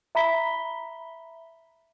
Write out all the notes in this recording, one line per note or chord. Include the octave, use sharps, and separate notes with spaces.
E5 A#5 B5 B6 G7